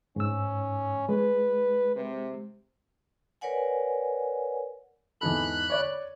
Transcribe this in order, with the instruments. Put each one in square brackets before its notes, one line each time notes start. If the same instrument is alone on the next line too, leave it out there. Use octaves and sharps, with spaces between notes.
[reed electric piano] G#2 E6 [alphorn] C#4
[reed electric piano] G#3 [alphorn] B4
[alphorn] C3
[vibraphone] A#4 B4 C#5 D5 F#5 G#5
[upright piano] E2 G#2 A4 [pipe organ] B5 F#6
[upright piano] C#5 D5